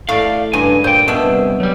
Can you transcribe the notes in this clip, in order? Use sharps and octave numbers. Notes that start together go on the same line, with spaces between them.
A2 D5 F5
C#2 G2 G#5
A#2 C5 G5
B2 D4 E5
C2
F#3 G3